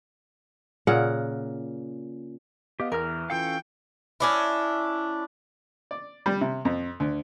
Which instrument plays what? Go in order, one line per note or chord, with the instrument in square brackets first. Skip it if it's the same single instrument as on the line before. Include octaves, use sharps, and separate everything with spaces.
[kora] A#2 C#3 A#4 F#5
[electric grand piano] B3 D#5 F5 [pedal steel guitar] G4
[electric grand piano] E2 [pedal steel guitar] E3 F6 [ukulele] A#4
[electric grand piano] E3 F4 C#7 [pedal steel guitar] C#4 A4 F5 [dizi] G5
[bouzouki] C#4 D4 E4
[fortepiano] D5
G3
C3
F2
D2